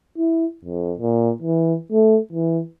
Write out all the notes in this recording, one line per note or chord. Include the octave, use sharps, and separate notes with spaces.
E4
F2
A#2
E3
A3
E3